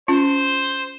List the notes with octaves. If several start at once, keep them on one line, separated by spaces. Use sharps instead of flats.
C#4 F4 C5